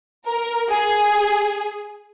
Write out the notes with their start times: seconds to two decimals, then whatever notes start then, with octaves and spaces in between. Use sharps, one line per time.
0.27 A#4
0.69 G#4